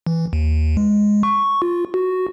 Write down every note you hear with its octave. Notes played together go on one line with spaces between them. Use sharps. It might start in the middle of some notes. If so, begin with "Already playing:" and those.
E3
D#2
G#3
C#6
F4
F#4